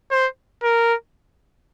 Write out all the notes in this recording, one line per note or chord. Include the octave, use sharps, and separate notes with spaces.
C5
A#4